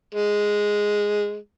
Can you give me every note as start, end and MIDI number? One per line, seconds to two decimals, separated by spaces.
0.14 1.36 56